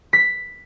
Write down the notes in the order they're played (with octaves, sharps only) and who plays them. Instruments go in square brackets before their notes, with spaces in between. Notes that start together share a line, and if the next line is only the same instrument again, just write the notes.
[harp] B6